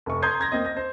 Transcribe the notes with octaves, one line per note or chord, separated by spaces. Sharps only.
F1 C#6
A#5 C6 D#6 G6 G#6 C7
C6 G#6 A#6
A#3 C4 D#5
A#6
C5